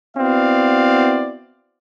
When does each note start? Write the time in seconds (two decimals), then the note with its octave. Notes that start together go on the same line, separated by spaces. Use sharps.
0.17 B3 C4 E4 F#4 D5 F5